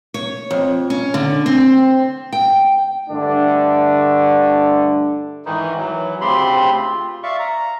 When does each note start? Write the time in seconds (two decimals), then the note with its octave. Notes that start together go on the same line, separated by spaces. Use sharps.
0.14 C#5
0.51 F2
0.90 C#4
1.14 D3
1.46 C4
2.33 G5
3.09 G2 D3 A3 D4
5.46 G#2 D#3 E3 D#4
5.78 E3 F#3
6.21 D2 C#3 C4 G4 B5 C6
6.76 F4
7.23 D5 E5 F5 C#6
7.39 A#5